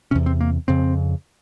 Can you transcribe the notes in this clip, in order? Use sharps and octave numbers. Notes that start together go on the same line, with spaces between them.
E2 C3 C#4
C4
A#3
F2 C#3 C4